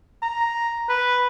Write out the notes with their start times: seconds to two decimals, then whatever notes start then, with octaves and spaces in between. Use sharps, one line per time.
0.22 A#5
0.89 B4